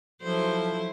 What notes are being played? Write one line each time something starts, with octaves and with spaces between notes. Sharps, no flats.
F3 F#3 E4 A4 C5